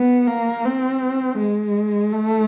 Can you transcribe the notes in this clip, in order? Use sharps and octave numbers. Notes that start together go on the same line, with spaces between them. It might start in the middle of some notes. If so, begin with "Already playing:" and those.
Already playing: B3
A#3
C4
G#3
A3